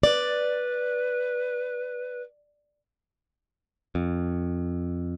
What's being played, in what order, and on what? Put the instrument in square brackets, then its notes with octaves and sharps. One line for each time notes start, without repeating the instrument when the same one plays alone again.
[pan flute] B4 [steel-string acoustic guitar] D5
[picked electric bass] F2